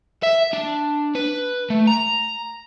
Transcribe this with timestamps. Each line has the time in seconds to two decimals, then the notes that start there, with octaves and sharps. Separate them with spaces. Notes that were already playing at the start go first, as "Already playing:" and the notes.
0.23 E5
0.53 D4
1.15 B4
1.70 A3
1.87 A#5